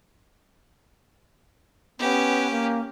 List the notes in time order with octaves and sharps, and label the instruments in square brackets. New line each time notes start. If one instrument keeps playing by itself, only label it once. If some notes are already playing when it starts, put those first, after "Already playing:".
[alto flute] B3 [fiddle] C#4 G4
[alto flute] A#3